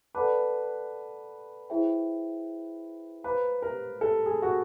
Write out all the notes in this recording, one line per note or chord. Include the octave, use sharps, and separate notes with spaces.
A4 B4 D5 F#5 A5 D6
E4 G#4 C5 E5 G5
B4 C5 F5 A#5 D6
A#4
A4
G#4
F#4